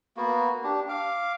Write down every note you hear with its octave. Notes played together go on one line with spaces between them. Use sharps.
A#3 B3 F#4
D4 G4
F5 D6